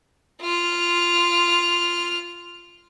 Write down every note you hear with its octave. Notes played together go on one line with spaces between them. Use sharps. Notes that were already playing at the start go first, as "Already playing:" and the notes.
F4 F6